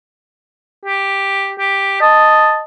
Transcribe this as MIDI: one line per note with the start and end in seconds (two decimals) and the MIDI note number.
0.86 1.54 67
1.59 2.00 67
2.01 2.62 75
2.01 2.60 81